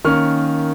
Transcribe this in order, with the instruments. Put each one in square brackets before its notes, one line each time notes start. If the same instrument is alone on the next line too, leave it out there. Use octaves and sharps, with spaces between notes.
[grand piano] D#3 A#3 C#4 C#6 F6